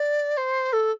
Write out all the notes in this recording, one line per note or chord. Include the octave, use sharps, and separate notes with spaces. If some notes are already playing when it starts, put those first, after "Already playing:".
Already playing: D5
C5
A4